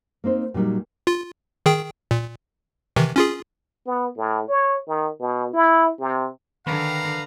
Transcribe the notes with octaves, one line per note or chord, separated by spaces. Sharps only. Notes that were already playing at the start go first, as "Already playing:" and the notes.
A#3 C4 D#4 C5
A#2 F#3 G3 D#4
F4
D#3 G#4 G5
A#2
C3 D#3 E3
C#4 F4 G#4
B3
A2
C#5
D#3
B2
E4
C3
D3 D#3 B4 F5 A#5